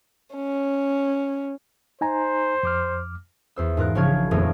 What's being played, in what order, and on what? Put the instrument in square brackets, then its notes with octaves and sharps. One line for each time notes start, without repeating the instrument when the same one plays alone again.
[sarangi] C#4
[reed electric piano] D#4 G#5 A#5 [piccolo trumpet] C5
[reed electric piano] F2 D6 F6
[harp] E2 C5 E6
G#2 F4 A#4 F#6
A#1 C#3 F3 C#5 F6 G#6
D#1 F2 A3 G#4 A#4 C#5